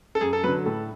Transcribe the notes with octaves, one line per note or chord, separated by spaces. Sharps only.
A4
F#2 G#4
A4
D3 F#3 B4
A2 A4